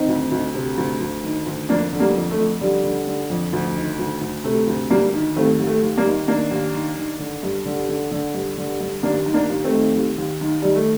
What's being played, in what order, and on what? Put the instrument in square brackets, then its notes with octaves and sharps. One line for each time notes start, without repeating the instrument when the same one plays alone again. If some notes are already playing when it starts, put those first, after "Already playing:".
Already playing: [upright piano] D#3 C4 D#4
D2
D2
C3
D2
D2
D#3
D2
F2 A#3 D4
D3
G3 A#3
F2
A3
F2
D3 G3
D3
D3
F2
D2
D#3
D2
D2
C3 A3
D2
D2 G3 A#3
D#3
D#2 A3 C4
D#2
A3
D#2
G3 A#3
D#3
D#3 A#3 D4
D#2
D#3
D#3
D3
G2
D3
D3
D3
G2
D3
G2
D#2 A#3 D4
D#3
A#3 D4
D#2
A3 C4
D#3
D#2
D#2
D#3
D#3 G3
A3